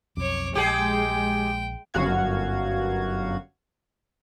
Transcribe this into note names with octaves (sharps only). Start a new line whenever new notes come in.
B1 F2 C#5 D6
A#1 G#3 G4 G#4 G5
G1 F#2 F#4 F5 G#6